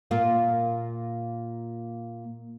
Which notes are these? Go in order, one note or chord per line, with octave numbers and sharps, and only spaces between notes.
A#2 A#3 F4